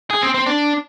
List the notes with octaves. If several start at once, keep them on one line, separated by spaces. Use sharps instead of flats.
G#4
C4
C4
D4